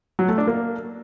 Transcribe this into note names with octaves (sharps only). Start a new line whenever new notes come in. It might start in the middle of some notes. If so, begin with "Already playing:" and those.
F#3
A3
D4
A#3